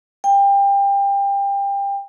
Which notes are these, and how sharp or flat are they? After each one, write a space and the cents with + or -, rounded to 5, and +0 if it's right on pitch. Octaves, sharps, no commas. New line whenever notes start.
G5 +25